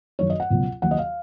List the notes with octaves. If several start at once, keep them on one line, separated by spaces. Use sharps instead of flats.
F#2 D#3 F#3 C#5
D#5
F#5
C#2 B2 F#3
D#2 D#3 F#3 F#5
D#5
F5